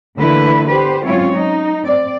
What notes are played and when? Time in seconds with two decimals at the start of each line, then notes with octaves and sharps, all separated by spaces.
0.17 D3 E3 A3 A#3 E4 B4
0.68 B3 G4 B4 C5
1.03 F#3 G#3 C4 C#4 F4 C#5
1.36 D#4
1.84 C4 D5